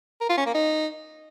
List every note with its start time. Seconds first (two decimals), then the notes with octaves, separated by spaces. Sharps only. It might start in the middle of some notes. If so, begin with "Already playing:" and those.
0.21 A#4
0.29 F4
0.38 C#4
0.46 A#3
0.54 D#4